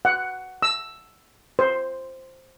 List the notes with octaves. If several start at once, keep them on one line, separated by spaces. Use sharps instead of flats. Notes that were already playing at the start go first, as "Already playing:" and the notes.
F#5
E6
C5